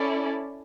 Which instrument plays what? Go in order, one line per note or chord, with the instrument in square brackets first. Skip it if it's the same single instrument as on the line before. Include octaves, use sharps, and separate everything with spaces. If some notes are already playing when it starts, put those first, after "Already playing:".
Already playing: [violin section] C#4 E4 A4 D5